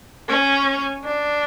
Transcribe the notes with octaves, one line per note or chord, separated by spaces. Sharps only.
C#4
D4